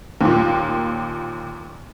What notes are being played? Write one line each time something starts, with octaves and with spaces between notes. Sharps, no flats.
D#2 A#2